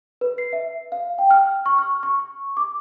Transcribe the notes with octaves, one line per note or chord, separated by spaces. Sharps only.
B4
C7
E5
F5
G5
F6
C#6
F6
C#6
D6